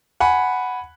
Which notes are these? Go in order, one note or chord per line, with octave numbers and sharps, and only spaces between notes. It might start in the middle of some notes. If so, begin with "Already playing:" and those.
F#5 G#5 B5